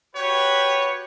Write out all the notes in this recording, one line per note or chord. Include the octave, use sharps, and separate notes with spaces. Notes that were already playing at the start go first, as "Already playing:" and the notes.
F#4 G4 B4 C#5